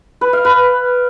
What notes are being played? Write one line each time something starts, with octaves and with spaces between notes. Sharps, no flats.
B4
F5
B4